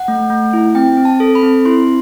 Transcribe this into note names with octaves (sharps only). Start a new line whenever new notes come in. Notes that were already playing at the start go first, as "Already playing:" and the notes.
Already playing: F#5
A3
A3
E4
C4 G5
C4
A5
A4
B5
C4
E4 C6